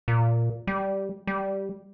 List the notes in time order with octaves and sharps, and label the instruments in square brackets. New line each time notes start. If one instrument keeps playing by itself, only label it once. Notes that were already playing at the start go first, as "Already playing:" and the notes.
[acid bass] A#2
G3
G3